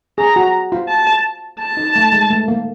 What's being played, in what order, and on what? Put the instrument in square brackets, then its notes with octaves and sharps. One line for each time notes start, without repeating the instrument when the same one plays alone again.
[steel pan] G#4 [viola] A#5
[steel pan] F#4
F4
[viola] A5
A5
[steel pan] D#4
A3
G#3
A3
A#3